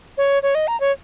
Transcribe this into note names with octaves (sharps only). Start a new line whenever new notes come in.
C#5
C#5
D#5
A#5
C#5